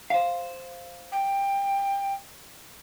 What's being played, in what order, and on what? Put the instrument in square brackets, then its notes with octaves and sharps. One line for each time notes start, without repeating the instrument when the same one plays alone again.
[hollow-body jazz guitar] C5 F5
[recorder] G5